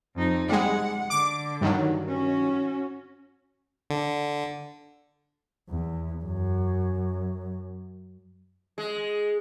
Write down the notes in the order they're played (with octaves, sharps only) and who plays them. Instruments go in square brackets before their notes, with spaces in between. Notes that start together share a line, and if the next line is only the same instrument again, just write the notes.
[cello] F2 D#4
[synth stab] G3 G#3 [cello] F#5
[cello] D3 [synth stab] D6
[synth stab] G2 D#3 F#3
[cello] C#4 F#4
[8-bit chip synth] D3
[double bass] E2
F#2
[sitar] G#3